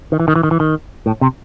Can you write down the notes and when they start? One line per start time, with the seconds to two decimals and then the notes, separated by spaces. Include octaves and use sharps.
0.12 D#3
0.20 E3
0.28 D#3
0.36 E3
0.43 D#3
0.51 E3
0.60 D#3
1.06 A2
1.21 C3